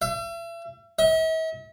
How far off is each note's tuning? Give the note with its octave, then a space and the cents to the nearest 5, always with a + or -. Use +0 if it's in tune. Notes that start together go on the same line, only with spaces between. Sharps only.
E5 +40
E5 -45